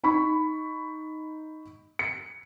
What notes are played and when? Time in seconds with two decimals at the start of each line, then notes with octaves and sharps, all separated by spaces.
0.03 D#4 B5 C#6 B6
1.99 C#7